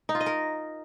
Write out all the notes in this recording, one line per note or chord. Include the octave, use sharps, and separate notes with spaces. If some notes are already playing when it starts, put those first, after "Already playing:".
D#4
F4
D#5
A#4